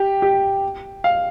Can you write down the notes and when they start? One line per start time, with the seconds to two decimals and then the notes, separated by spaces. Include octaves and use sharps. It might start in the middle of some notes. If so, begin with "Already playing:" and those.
Already playing: G4
0.22 G4
1.04 F5